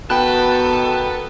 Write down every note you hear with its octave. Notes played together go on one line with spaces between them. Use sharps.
B2 D#3 B3 A4 G5 B5 F#6